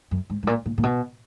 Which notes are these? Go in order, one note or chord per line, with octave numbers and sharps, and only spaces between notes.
F#2
G#2
G#2
A#2
A#2
A#2
B2